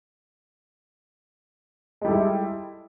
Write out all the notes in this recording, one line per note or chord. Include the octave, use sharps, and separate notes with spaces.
G3 G#3 E4 A4